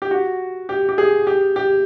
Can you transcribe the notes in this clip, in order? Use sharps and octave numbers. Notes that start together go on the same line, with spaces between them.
G4
F#4
G4
G4
G#4
G4
G4